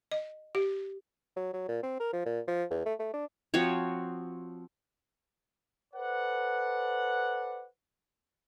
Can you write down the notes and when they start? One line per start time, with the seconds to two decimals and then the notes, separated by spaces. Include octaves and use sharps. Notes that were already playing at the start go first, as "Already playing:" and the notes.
0.12 D#5
0.55 G4
1.37 F#3
1.54 F#3
1.69 A#2
1.83 C4
2.00 A#4
2.13 F3
2.26 A#2
2.48 F3
2.71 E2
2.86 A3
2.99 A3
3.14 D4
3.54 F3 C4 F#4 C#5
5.94 A4 B4 C5 D5 F#5